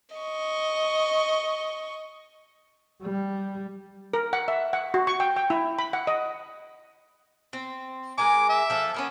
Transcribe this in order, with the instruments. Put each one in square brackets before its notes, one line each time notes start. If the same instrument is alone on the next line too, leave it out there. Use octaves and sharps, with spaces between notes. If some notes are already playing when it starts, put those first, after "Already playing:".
[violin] D#5 C#6
[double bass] G3
[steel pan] A#4
F#5
E5
F#5
F#4
C#6
G5
G5
E4
B5
F#5
D#5
[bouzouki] C4
[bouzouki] G#3 A#4 G#5 [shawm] D6
[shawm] E5
[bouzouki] F3 A4
A#3 B3 C#4